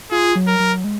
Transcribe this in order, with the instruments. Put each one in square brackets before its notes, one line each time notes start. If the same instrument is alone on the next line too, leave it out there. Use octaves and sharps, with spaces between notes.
[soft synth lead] F4 [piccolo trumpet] G#4
[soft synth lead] F#3
[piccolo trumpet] A#4
[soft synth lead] F#3
G#3